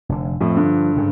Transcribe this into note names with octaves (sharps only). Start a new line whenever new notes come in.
F1 D3
F2 A2 F3
G2 D3
G#2 C#3